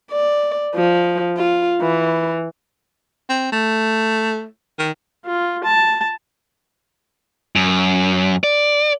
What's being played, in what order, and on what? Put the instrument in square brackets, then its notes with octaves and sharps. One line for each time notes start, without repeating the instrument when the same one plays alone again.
[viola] D5
F3
F4
E3
[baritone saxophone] C4
A3
D#3
[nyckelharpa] F4
A5
[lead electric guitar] F#2
D5